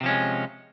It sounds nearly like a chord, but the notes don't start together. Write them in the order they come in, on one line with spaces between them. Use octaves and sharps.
C3 F3 C#4 G#3